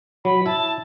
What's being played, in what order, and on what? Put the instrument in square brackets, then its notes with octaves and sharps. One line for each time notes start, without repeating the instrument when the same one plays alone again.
[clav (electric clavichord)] F#3 [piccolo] B5
[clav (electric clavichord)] E4 [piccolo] A5